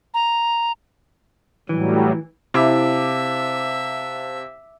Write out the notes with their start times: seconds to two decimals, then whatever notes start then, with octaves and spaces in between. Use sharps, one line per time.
0.14 A#5
1.69 A2 E3 F#3 G3
2.54 C3 E4 C5 E5 F5 A5 D6